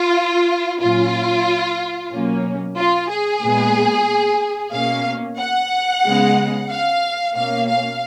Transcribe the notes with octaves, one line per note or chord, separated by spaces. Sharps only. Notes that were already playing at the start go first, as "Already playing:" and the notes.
Already playing: F4
A#2 F#3 C#4 F4
B2 F#3 A#3 C#4
F4
G#4
A#2 G#3 B3
B2 A#3 C#4 F5
F#5
C#3 G#3 B3
F5
B2 A#3 C#4 F5
F5